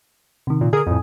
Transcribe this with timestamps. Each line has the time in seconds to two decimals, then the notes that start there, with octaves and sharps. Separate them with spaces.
0.47 C3 D#3
0.61 A#2
0.73 D3 G#4 A#4 G#5 D#6
0.87 F2 A2